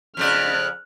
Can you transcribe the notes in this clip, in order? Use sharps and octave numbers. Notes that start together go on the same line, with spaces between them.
F2 C#3 D5 F6 F#6